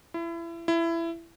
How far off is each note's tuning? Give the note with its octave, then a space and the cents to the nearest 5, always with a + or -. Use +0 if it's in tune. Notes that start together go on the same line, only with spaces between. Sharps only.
E4 +30
E4 +20